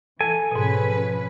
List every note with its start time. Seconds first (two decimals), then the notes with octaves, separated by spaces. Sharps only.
0.21 E3 A4 G#5
0.51 G#2 B2 F3 C#4 B4